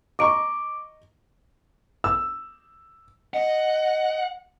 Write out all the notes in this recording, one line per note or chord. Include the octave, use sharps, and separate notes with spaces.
D#5 A#5 C#6 D6 D7
E6
D#5 F#5